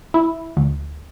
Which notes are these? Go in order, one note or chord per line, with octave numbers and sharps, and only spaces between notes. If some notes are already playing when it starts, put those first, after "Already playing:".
E4
D2